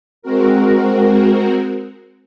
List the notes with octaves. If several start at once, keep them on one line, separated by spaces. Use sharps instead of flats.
G#3 C4 F#4 A#4